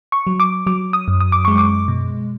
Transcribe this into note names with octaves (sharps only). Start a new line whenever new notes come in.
C#6
F#3
D6
F#3 D6
D#6
F#2
D#6
D6
G#3 C#6
D6
B2